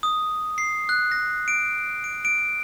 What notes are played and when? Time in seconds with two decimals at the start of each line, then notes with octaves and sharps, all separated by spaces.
0.03 D#6
0.58 C7
0.89 F#6
1.12 A#6
1.48 D7
2.04 D7
2.25 D7